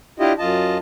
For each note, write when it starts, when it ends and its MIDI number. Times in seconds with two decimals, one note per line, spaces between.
0.19 0.33 62
0.19 0.33 64
0.19 0.33 65
0.19 0.33 67
0.19 0.33 75
0.39 0.78 42
0.39 0.78 65
0.39 0.78 75
0.39 0.78 81